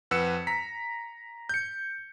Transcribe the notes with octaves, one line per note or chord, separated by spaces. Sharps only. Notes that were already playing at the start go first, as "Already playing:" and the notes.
F2 B4 F#5 E6 C#7 E7
A#5 B6
G6 C#7